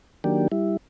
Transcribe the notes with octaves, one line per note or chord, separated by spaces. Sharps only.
D#3 F#3 A#3 D4 G4
G3 E4